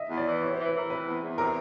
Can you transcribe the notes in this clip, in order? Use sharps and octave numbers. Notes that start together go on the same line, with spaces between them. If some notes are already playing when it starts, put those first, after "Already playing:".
Already playing: D#5 E5
E2
D5
E3
C3 C#5
C5
E3
B4
E3 A#4
C3 B4
E2
E2
C3 A#4